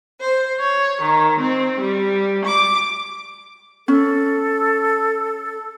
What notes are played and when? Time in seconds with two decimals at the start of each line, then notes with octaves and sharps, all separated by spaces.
0.21 C5
0.59 C#5
1.01 D#3
1.39 C4
1.80 G3
2.43 D6
3.88 C#4 A4